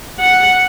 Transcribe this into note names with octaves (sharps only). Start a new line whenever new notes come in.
F#5